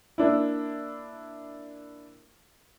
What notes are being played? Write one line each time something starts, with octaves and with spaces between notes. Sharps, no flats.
A#3 D4 E4